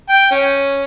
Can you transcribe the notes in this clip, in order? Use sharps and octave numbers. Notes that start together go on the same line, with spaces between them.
G5
C#4